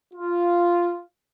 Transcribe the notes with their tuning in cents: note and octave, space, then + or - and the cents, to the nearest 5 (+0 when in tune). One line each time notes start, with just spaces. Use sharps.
F4 -5